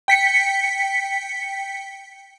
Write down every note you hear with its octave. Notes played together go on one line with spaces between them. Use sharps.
G5 B6 C#7